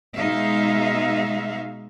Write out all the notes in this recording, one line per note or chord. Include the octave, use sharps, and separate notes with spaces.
B2 G#3 D#4 E5 F5